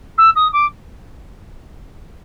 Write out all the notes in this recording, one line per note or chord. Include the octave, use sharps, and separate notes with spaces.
E6
D#6
D6